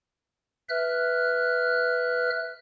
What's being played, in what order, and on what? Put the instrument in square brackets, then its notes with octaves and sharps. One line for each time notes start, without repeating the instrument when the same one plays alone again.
[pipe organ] B4 E5 F6 F#6